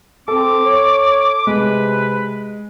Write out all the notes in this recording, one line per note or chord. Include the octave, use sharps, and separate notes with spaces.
C4 A4 D6
C#5
C3 G#3 B4